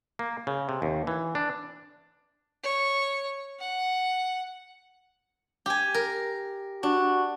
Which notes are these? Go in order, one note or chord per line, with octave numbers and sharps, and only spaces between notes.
A#3
C#3
C3
D#2
E3
D4
C#5
F#5
G4 G#5
A#4
D4 F#4